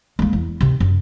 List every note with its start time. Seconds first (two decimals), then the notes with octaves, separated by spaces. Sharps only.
0.19 G#3 A#3
0.33 E2
0.61 C3 D#3
0.80 F#2